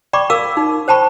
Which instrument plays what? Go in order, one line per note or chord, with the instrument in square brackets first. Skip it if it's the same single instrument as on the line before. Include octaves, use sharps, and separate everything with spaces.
[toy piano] D5 G5 B5 C#6 D6
A#4 F5 D6 E6
D#4
C5 G5 A5 B5 C#6